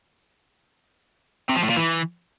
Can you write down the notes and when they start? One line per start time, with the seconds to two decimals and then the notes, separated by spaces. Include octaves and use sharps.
1.50 C3
1.56 F3
1.63 A2
1.70 A#2
1.77 E3